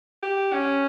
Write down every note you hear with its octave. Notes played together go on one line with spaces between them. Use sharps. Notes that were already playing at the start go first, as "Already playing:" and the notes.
G4
C#4